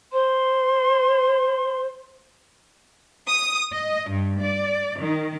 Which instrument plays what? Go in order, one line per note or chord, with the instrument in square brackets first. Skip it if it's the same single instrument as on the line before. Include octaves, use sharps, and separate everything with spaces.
[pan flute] C5 [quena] C6
[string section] D#6
D#5
G2
D5
D#3